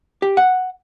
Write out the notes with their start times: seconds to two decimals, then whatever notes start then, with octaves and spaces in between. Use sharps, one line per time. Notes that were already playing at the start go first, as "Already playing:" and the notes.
0.22 G4
0.37 F#5